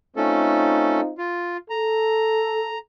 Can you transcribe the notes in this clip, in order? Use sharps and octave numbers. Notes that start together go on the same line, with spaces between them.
A3 C4 C#4 D#4 F4 A4
F4
A4 A#5